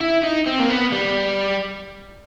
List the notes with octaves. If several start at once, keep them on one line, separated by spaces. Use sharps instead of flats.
E4
D#4
C4
A#3
B3
G3